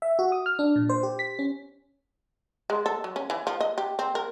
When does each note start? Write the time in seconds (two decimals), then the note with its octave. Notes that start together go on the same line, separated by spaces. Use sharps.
0.02 E5
0.19 F#4
0.32 D#6
0.46 F6
0.59 D4
0.76 A#2
0.90 C5
1.03 G4
1.19 B6
1.39 C#4
2.70 G#3
2.86 A4
3.04 F#3
3.16 C#4
3.30 E3
3.47 F3
3.60 D#5
3.78 G4
3.99 C4
4.15 A#4